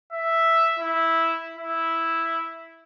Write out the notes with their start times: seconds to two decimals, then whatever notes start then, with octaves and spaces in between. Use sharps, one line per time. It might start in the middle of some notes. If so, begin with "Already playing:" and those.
0.13 E5
0.79 E4
1.56 E4